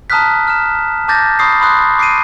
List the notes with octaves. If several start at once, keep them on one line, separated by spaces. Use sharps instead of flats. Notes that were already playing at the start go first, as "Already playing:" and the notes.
A5 A#5 D#6 F6 F#6 B6
F6 E7
A5 D6 G6 A6 A#6
B5 C#6 D#6 C7
B5 C6 D#6 F#6
D6 C7 D7 D#7